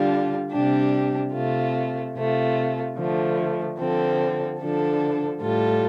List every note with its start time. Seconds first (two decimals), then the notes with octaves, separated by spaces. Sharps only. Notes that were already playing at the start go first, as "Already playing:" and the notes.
Already playing: D3 G3 D4 F4
0.51 C3 G3 D4 G4
1.33 C3 A3 F4
2.15 C3 A3 F4
2.97 D3 F3 A3
3.78 D3 F3 C4 A4
4.60 D3 F3 D4 A4
5.41 A2 G3 F4 A4